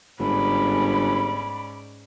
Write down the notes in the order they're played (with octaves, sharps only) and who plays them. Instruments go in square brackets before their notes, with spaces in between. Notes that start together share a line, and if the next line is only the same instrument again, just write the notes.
[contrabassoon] G1 [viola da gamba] G#2 C#4 D5 [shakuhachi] B5